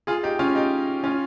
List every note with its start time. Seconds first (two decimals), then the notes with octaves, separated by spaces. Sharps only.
0.07 F4 G#4
0.23 D#4 G4
0.39 C#4 F4
0.55 D#4 G4
1.04 C#4 F4